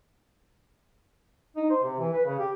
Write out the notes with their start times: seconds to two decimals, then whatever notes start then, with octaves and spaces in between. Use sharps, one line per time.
1.57 D#4
1.70 C5
1.83 C3
1.99 E3
2.13 B4
2.25 C#3
2.39 G4